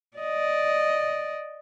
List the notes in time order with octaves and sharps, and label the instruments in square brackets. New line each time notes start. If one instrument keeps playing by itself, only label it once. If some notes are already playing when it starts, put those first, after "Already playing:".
[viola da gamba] D5 D#5